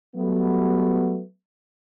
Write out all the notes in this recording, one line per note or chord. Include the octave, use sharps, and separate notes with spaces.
F#3 G3 A3 B3